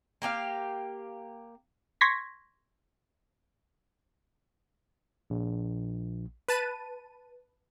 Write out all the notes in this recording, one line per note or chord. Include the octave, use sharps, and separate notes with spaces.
A#3 G4 G#4 F5
C6 C#6 G#6 A#6 B6
A#1
B4 A5 D#7